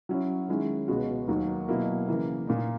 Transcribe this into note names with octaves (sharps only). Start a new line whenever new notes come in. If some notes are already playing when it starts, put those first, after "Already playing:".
F#3 C#4 E4
D#3 G#3 C#4 E4
C#2 B2 G#3 B3 F#4
D#2 D#3 F#3 A#3
B2 F#3 A#3 E4
C#3 E3 A#3
A#2 A#3 D#4